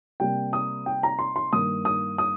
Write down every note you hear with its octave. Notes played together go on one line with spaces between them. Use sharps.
C3 G3 A#3 G5
D#6
G5
A#5
C6
C6
G2 D#3 A#3 D#6
D#6
D#6